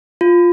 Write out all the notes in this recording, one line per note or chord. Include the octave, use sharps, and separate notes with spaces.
F4